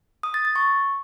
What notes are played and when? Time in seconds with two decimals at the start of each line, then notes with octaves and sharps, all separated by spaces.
0.23 D#6
0.34 A6
0.45 A6
0.56 C#6